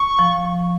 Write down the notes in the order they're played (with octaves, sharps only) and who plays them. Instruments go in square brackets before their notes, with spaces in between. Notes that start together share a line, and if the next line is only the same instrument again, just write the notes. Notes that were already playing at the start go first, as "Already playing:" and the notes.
Already playing: [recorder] C#6
[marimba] F3